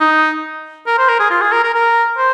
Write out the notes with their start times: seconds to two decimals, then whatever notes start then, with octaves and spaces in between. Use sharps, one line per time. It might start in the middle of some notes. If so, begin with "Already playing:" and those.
0.01 D#4
0.87 A#4
0.98 C5
1.09 A#4
1.20 G#4
1.31 F4
1.42 G#4
1.52 A#4
1.64 A#4
1.74 A#4
2.18 C5